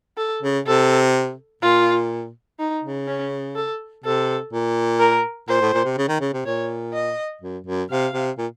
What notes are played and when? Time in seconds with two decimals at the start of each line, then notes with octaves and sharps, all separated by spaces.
0.17 A4
0.42 C#3
0.66 C3 A4
1.62 A#2 F4
2.59 D#4
2.84 C#3
3.07 C#4
3.55 A4
4.04 C3 A4
4.53 A#2
5.00 A#4
5.48 A#2 C5
5.61 A2
5.73 A#2
5.85 C3
5.97 C#3
6.08 D#3
6.20 C#3
6.34 C3
6.46 A#2 C#5
6.93 D#5
7.41 F#2
7.66 F#2
7.90 C3 F5
8.14 C3
8.38 A#2